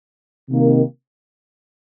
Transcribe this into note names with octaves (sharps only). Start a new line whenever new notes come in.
C3 D#3 A#3